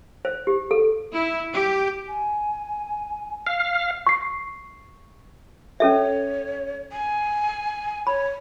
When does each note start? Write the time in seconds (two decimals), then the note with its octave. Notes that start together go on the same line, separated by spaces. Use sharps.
0.25 C5
0.47 G4
0.71 A4
1.14 E4
1.51 G4
2.08 G#5
3.46 F5
4.07 C#6 C7
5.80 C#4 A4 C#5 E5
6.92 G#5
8.07 C#5 B5